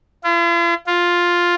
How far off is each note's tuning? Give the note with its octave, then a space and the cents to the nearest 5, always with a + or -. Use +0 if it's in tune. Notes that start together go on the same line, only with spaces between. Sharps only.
F4 -45
F4 +5